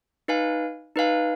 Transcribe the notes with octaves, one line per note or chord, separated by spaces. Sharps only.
D#4 B4 F5 G#5
D#4 B4 F5 G#5